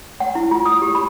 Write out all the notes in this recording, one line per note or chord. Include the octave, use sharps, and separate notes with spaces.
F#5
E4
F4
D#6
G4
B5